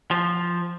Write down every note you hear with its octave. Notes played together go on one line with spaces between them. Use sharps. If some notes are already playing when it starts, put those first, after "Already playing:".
F3